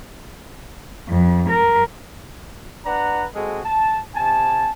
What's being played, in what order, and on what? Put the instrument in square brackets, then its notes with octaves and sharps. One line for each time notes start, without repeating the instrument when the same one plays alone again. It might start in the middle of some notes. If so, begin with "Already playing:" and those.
[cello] F2
A#4
[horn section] D4 B4 F#5 A#5
G#3 C4 F#4 G#4 A4
A5
C3 G#5 A5